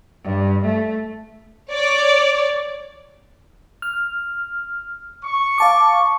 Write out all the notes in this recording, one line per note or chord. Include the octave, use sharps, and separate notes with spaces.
G2
A3
C#5 D5
F6
C#6
F5 A5 D6